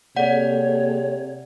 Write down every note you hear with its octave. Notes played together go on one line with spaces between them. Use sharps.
C3 A#3 G#4 A4 C#5 D5 F#5